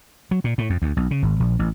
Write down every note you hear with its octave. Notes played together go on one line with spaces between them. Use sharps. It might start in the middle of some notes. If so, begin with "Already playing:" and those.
F#3
A#2
A2
F2
D2
B1
C#3
G#1
A#1
A1